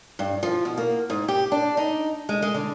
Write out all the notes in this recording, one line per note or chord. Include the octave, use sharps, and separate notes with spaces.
G2
F3
B2
A#3
G#2
G4
D4
D#4
G#3
G#3
D3